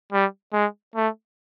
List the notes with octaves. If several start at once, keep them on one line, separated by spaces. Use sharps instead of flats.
G3
G#3
A3